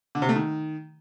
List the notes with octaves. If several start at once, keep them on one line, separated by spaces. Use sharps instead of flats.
D3
C3
A3
D#3